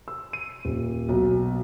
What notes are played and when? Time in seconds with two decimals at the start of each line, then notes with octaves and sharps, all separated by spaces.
0.08 E6
0.33 D#7
0.65 D#1
1.09 B1